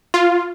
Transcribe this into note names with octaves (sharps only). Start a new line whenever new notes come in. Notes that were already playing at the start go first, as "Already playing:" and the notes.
F4